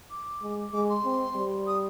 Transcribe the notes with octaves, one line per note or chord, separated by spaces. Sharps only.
D6
G#3
G#3 D6
C6
C4
G3
D#6